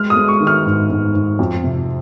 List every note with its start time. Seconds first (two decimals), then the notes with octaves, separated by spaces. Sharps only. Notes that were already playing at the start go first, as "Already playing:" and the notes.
Already playing: G#3 F6
0.10 D#6
0.16 G#3
0.28 C#6
0.40 D#3
0.47 F6
0.65 G#2
0.90 G#2
1.14 G#2
1.39 F2
1.63 C3